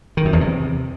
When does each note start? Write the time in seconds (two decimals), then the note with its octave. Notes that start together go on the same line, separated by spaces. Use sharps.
0.17 D#3
0.25 F#2
0.33 E2
0.41 C3